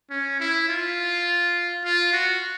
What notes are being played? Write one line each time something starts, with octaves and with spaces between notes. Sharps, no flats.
C#4
E4
F4
F4
F#4